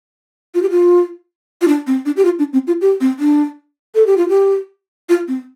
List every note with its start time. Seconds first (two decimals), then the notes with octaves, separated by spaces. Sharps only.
0.55 F4
0.62 G4
0.70 F4
1.62 F4
1.68 D4
1.87 C4
2.06 D4
2.17 G4
2.25 F4
2.39 D4
2.53 C4
2.67 F4
2.81 G4
3.01 C4
3.19 D4
3.95 A4
4.06 G4
4.17 F4
4.29 G4
5.09 F4
5.28 C4